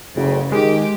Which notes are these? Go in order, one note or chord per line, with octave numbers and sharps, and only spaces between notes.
F#1 D2 C#3
D#3 G#3 G4